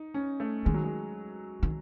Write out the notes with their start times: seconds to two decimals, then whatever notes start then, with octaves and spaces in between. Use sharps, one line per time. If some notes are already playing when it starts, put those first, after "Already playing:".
Already playing: D#4
0.14 C#4
0.40 A3
0.65 D#3 G#3
0.74 F#3
0.83 G#3
1.63 D#3